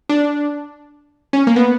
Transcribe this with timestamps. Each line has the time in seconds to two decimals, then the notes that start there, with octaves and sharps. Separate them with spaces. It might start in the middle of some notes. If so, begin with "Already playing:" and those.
0.09 D4
1.33 C#4
1.47 A#3
1.56 B3